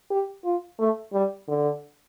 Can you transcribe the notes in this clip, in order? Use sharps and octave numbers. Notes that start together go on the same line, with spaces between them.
G4
F4
A3
G3
D3